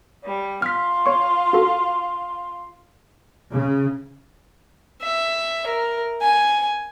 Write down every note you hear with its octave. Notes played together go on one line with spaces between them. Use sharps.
G3
F4 F6 B6
C#5 C#6
F#4 A4
C#3
E5
A#4
G#5